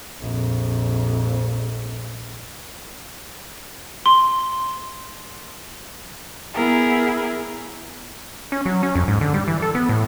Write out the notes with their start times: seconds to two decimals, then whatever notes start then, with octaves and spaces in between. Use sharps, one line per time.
0.20 A#1 F2
4.06 C6
6.54 B3 E4 G#4 A#4
8.52 C#4
8.66 F#3
8.83 C#4
8.95 F2
9.08 G#2
9.21 D3
9.34 G3
9.48 E3
9.62 A4
9.75 B3
9.89 A2